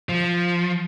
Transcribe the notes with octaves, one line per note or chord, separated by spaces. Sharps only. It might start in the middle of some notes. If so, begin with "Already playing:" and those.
F3